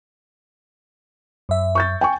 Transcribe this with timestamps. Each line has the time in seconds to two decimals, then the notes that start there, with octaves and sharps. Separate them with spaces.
1.49 F#2 E5
1.75 C#6 G6 A6
2.01 G5 G#5 C#6